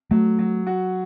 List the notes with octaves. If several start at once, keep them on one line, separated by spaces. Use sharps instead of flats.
F#3 A3
F#3
F#4